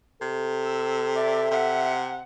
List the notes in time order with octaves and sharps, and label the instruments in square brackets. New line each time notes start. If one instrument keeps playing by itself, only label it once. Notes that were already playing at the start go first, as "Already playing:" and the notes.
[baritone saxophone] C3 [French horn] A4
[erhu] E6
[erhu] D5 [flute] E5
[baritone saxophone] C3 [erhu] F#5